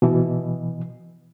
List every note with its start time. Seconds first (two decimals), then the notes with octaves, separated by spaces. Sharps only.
0.02 B2 E3